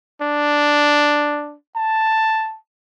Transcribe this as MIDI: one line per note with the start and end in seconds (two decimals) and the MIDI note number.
0.22 1.56 62
1.76 2.57 81